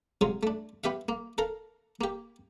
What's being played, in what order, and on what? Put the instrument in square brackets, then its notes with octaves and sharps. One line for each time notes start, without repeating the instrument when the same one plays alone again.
[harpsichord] C3 F#3 G#3 F4
A3 D4
B3 G4 E5 F5
A#3
A4 A#4 F5
A#3 G4